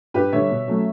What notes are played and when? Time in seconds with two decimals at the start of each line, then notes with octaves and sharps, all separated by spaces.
0.14 G2 G4 B4
0.32 D3 G3 C#5 E5
0.50 B2
0.68 F#3 A3 C#4